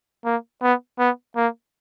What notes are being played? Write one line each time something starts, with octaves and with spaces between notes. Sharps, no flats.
A#3
B3
B3
A#3